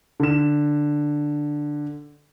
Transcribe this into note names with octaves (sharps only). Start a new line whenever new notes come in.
D3 E7